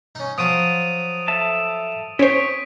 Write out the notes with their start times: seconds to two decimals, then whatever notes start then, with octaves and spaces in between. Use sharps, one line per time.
0.15 C#4 D#4
0.38 F3 F#3 F4 D#6 D7 D#7
1.28 A4 E5 A5
2.19 C4 C#4 C5 C#5 C#6 B6 D7